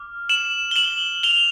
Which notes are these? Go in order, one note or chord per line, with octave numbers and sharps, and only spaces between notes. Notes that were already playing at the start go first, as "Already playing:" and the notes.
Already playing: D6 F6
E7 F#7
G7
E7 F#7
F7 G7